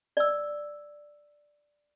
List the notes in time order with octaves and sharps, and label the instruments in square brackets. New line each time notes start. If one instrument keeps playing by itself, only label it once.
[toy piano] D5 E6